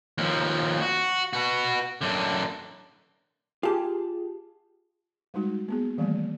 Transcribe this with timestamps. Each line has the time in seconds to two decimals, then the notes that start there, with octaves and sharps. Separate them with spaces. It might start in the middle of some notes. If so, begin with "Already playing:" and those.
0.18 D#2 F3
0.81 F#4
1.33 F#4 B4
2.01 F#2 D3
3.63 F4 G4 G#4 A5
5.34 G3 G#3 D#4 F#4
5.68 A#3 B3 G#4
5.98 D#3 E3 G3 A3 A#3